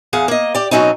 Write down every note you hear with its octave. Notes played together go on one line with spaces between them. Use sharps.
E2 G#4 F5 F#5
A#3 D#5
G4 D5
B2 F#3 C4 C#4 D#4